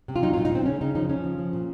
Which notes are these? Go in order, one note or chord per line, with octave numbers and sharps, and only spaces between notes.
C3
F4
F#3 D#4
F4
A#2
D#4
A#2 C4
C#3 C#4
C#3 D#4
F3 D#4
F3 C#4
C#3
F3
A#2